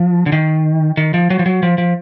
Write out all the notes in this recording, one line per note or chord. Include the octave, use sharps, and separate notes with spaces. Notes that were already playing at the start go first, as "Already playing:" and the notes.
Already playing: F3
D3
D#3
D#3
F3
F#3
F3
F#3
F3
F3